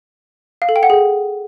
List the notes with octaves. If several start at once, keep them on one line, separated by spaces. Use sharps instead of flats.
F5
A4
G5
F#5
G#4